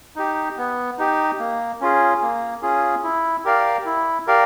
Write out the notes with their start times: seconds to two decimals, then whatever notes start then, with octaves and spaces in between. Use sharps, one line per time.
0.16 D#4 G4
0.58 B3
0.98 D#4 G4
1.39 A#3
1.81 C#4 F4 G#4
2.22 A#3
2.62 C#4 F4 G#4
3.04 E4
3.45 G4 A#4 D5 F5
3.85 E4
4.27 G4 A#4 D5 F5